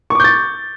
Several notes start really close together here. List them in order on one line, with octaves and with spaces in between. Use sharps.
C#6 D6 G6 A6